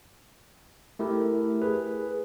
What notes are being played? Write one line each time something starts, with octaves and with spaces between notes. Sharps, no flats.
A3 E4 G4 A#4
G#4 B4